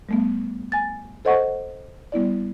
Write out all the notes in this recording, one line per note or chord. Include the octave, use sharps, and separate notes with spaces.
G3 A3 B3
G#5 A6
A4 C5 D#5 F#5 C#6
G3 B3 E4 D5